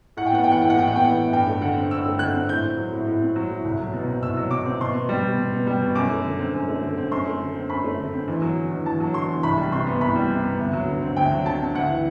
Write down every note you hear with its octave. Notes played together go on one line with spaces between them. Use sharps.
A2 F#5
G5
B3 F#5
E3 G5
F#5
A2 G5
F#5
A2 G5
B3 F#5
G5
E3 F#5
A2
G2 G5
A3
D3 F#5
C4
G2 E6
A3
D3 F#6
C4
A2 G6
C4
F#3
A2
A2
C4
F#3
A2
C2
F#3
B2
C4
C2 E6
F#3
B2 D6
C4
B2 C6
B3
G3
B2
B2
B3
G3
B2
F#2 D6
A3
D3
C4
F#2
A3
D3
C4
F#2 C6
A3
D3
C4
F#2 B5
A3
D3
C4
E2
F#3
D3
E2
E2 A5
F#3
D3 C6
E2
C2 B5
G3
C3 C6
B3
C2 B5
G3
C3
B3
D2
F#3
D3
C4
D2 G5
F#3
D3 A5
C4
D2 F#5
E3